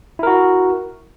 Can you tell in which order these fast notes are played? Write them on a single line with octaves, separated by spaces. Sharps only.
E4 A#4 F#4